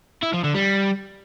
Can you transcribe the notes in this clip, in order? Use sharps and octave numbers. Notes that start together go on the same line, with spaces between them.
E4
F3
D3
G3